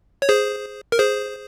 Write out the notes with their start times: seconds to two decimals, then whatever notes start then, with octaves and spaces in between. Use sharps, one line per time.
0.22 C#5
0.29 G#4 C5
0.92 A#4
0.99 G#4 C5